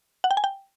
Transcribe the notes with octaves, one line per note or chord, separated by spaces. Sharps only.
F#5
G5
G#5
G5